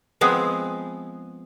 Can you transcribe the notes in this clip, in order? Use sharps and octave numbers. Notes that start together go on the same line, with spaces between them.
F3 G#3 B3 C4 G#4